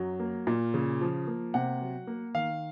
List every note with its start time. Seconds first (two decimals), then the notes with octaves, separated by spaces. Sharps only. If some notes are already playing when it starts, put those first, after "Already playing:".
Already playing: F#2 F#3
0.20 A#3
0.47 A#2
0.74 C#3
1.01 F3
1.27 A#3
1.54 C3 F#5
1.81 F#3
2.07 A#3
2.34 D#3 F5